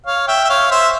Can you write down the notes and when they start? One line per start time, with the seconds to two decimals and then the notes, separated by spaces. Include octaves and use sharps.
0.06 C#5 F5
0.28 E5 G5
0.44 E5
0.49 C#5 F5
0.71 C5 E5